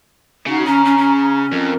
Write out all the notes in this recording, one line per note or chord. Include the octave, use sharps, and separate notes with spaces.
C#3 D#4 F#4
C#4 A#5
C#4
C#4
F2 A#4